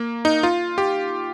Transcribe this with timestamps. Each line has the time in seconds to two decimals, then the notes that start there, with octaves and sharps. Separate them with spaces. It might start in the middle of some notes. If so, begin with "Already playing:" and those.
Already playing: A#3
0.25 D#4
0.43 F4
0.78 G4